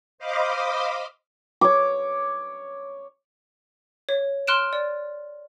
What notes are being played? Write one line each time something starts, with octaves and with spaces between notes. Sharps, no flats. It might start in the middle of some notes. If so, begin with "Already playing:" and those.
C5 D#5 F5 B5 D6
C#5 D6
C#5
C6 F6 F#6 D7 E7
D5